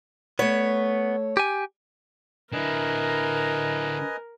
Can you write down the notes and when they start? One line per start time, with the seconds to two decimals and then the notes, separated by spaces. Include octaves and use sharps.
0.39 A3 B3 C#5
1.37 G4 G#5
2.53 D3 E4 A#4 B4 D#5 G#5